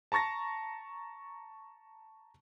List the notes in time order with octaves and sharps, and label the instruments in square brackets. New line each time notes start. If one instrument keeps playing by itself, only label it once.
[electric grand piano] A5 A#5 C#6 A6 A#6